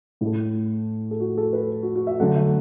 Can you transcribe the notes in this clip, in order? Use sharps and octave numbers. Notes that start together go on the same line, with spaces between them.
A2 A3 E4
A4
F#4
A4
B4
F#4
F#4
E5
D3 F#3 A3 F#5
E5